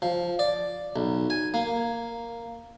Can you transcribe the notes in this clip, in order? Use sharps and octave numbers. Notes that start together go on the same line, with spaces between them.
F3
D5
B1
G#5
A#3